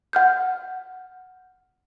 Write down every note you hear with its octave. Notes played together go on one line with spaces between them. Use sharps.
F#5 F6 G6